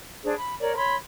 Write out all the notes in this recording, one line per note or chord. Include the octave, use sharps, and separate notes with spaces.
D4 G#4 C5
B5
A#4 C#5 D5
C#5 B5 C6